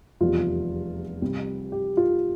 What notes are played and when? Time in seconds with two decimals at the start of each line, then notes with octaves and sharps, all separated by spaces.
0.21 F1 E2 E3 G3 F4
1.21 C2 C3 G3
1.72 G4
1.97 F4